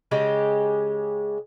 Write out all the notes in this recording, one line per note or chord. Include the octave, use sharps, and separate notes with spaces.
C#3 G#3 G4